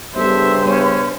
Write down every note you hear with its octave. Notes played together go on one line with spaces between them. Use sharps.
G2 C#3 B3 G4 A4 C5 E5
B3 C#4 C#5 G#5